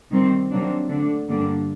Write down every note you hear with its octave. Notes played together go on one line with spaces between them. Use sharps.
C3 D#3 G3 C4
C3 F#3 A#3 D4
D3 A3 D4
G2 D3 G3 A#3 D4